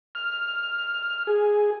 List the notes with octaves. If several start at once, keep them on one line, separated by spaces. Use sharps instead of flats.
F6
G#4